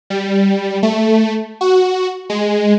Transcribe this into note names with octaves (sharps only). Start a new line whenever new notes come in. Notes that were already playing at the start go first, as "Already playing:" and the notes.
G3
A3
F#4
G#3